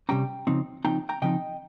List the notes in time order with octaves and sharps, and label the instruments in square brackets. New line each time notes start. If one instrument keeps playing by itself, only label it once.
[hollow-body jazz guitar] C3 G3 C#4 G5 A#5
C#3 F3 C4 D#4
C#3 F3 C4 D#4 G5 A#5
G5 A#5
C#3 F3 C4 D#4 D#5 G5